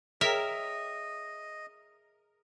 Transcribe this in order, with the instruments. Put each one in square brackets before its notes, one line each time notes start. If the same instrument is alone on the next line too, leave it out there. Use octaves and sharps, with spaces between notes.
[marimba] G#4 C#5 G5 [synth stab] A#4 [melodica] D#5 [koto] E5